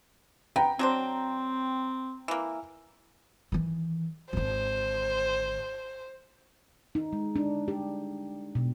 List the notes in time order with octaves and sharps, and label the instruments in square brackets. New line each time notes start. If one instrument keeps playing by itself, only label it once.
[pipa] B3 [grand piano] G5 A#5
[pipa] F#3 D4 C5 [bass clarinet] C4
[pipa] E3 A#3
[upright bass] D#3 E3
[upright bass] G#1 D3 [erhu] C5
[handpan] D#4
G#3
D4
G4
B2